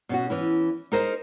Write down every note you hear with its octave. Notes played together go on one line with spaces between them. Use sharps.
B2 C#4 F#4
E3 C#4 E4
D#4 G#4 A#4 C5 D#5